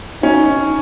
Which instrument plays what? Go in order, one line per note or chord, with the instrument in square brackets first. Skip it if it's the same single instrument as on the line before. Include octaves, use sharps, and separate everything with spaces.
[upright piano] C#4 [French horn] D#4